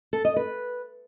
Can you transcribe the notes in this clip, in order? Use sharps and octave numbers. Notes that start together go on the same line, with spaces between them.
A4
D#5
B4